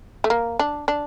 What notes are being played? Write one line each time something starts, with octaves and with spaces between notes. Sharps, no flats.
A3
A#3
D4
D4